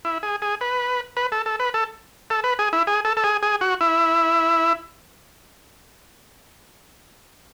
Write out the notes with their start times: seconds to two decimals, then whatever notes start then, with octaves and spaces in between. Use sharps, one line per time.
0.05 E4
0.23 G#4
0.42 G#4
0.61 B4
1.17 B4
1.32 A4
1.46 A4
1.60 B4
1.74 A4
2.30 A4
2.44 B4
2.59 G#4
2.73 E4
2.87 G#4
3.05 A4
3.17 A4
3.24 G#4
3.43 G#4
3.61 F#4
3.81 E4